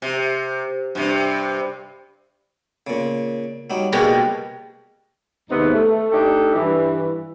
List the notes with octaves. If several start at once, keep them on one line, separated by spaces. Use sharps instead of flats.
C3
G2 C3
A#2 C#3
F#3 G3 D#4
B2 G3 G#3 A#3 D4 D#4
D#2 G#2 C3 B3 D#4
A3
A3 D4 D#4 G4 A4
G2 E3